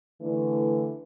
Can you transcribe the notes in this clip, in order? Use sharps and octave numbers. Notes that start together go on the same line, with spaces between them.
D3 E3 A3